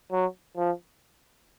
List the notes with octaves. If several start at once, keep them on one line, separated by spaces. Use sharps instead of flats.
F#3
F3